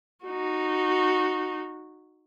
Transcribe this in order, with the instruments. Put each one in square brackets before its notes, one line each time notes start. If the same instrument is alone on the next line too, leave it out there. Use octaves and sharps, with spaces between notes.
[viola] D#4 F#4